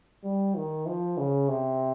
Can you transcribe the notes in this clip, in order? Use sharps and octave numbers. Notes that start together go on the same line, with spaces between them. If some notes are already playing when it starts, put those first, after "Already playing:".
G3
D#3
F3
C#3
C3